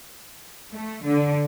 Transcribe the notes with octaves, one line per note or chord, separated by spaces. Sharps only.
A3
D3